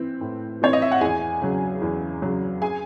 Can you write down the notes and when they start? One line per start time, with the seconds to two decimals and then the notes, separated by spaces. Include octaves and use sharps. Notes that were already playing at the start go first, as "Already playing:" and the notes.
Already playing: E3 C4
0.21 A2
0.62 E3 C4 C#5
0.73 D#5
0.82 E5
0.91 F#5
1.01 E2 G#4 G#5
1.42 C#3 F#3
1.82 E2
2.22 C#3 F#3
2.62 G#4 G#5